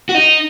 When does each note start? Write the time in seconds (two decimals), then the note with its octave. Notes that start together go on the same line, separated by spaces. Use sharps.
0.09 F#4
0.15 D#4